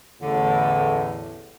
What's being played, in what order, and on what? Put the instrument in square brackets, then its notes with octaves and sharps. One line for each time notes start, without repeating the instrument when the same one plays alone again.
[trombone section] A1 E2 A2 [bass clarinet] D3